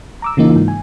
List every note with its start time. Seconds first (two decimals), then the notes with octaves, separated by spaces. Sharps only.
0.22 A#5 D6 E6
0.37 C#3 E3 A#3 D#4 F4
0.56 G#2
0.68 G#5